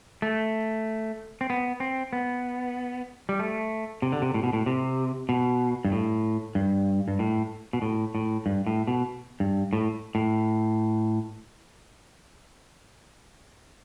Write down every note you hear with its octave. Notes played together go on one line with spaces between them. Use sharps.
A3
C4
B3
C4
B3
G3
A3
C3
D3
C3
A2
B2
A2
C3
B2
G2
A2
G2
G2
A2
B2
A2
A2
G2
A2
B2
G2
A2
A2